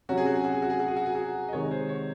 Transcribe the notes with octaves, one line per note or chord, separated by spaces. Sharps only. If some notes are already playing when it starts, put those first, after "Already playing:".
C3 F#3 C#4 F#4
G#4
F#4
G#4
F#4
G#4
F#4
G#4
F#4
G#4
F#4
G#4
F#4
D#5
C3 D#3 G#3 C#5
C5
C#5